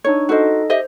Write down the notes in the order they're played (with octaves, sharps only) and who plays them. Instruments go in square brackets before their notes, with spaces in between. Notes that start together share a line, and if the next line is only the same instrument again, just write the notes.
[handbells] D4 D#4 C#6 [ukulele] C#5
[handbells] D#4 A4 D#5 [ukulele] F#4 C5
[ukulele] G4 D#5 E5 [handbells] C5